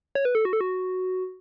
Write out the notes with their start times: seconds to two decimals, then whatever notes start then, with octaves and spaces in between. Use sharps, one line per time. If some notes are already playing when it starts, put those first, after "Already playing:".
0.15 C#5
0.25 B4
0.35 A4
0.45 F#4
0.53 A4
0.61 F#4